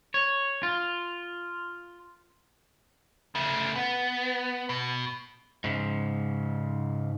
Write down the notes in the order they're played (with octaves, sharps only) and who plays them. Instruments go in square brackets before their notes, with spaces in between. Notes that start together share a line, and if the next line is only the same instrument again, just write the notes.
[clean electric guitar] C#5
F4
[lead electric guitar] C#3 A3
B3
B2
G#2 C#3